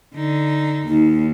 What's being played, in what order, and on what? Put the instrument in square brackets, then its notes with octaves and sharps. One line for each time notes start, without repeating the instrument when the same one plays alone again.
[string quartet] D3 D#4
[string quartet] D#2 [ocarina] D#4